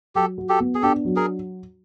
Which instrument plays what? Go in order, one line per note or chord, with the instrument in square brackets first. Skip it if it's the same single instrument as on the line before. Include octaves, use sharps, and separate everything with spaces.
[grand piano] F#3 [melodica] G4 A4
[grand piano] F#4
[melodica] G4 A4
[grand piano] B3
[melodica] G#4
[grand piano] D4 [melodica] G4 A4
[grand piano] F#3
[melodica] G#4 A#4